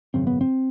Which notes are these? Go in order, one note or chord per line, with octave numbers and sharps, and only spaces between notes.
G#1 F#2 C#3 C4
B3
C4